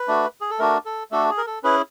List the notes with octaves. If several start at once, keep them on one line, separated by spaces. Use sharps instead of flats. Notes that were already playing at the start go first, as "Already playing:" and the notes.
Already playing: B4
A3 D4 F#4
G#4
A4
A3 D4 F#4 A#4
A4
A3 D4 F#4 A4
G#4
A#4
A4
C#4 E4 G#4 B4